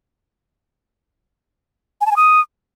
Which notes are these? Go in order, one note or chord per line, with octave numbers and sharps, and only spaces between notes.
G#5
A5
G#5
D#6